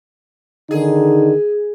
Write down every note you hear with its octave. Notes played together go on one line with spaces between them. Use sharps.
D3 D#3 D#4 G#4